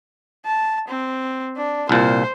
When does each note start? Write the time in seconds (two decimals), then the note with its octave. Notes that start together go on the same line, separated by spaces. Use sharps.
0.45 A5
0.89 C4
1.57 D4
1.89 C2 A#2 C5